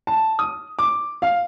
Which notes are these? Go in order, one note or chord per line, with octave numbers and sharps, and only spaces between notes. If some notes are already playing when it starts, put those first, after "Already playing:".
A5
D#6
D6
F5